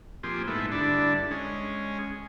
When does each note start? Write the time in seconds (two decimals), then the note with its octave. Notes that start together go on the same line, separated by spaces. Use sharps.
0.23 A#2 F3 C4 G4 G#4
0.47 G#2 A3 B3 E4
0.72 G2 D3 D4 E4
1.31 G#3 C#4